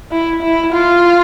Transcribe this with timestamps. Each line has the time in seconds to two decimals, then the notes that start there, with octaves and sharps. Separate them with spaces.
0.12 E4
0.42 E4
0.73 F4